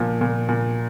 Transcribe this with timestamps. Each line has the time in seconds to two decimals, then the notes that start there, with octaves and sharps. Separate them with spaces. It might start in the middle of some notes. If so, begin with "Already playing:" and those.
Already playing: A#2 F3
0.21 A#2
0.49 A#2